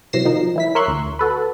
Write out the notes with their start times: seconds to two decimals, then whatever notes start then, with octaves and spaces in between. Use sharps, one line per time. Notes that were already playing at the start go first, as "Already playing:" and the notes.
0.13 C3 E3 F#3 A#6 C7 E7
0.25 D#3 F3 D#4
0.56 E3 E4 B6
0.75 A#4 C#5 E5 C6 C#6 F#6
0.87 D2
1.19 F#4 A4 B4